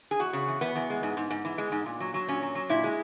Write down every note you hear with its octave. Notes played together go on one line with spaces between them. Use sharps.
G#4
E2 F#4
C#3
E2
E2 B3
E2
G#3
G#2
G#2
G#2
E3
G#3
G#2
A#2
F#3
F#3
A#2 C#4
F#3
F#3
A#2 E4
G#3